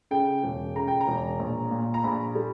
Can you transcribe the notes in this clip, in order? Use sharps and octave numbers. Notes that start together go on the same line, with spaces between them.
C#3 G5
E1
C#3 A#5
G5
A#5
E1
A#1
A#2
A#5
A#1 B5
G3